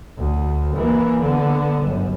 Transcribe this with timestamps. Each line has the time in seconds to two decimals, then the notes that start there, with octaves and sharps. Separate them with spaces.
0.19 D2
0.77 E3 A#3
1.21 D3 B3
1.83 G1 F#2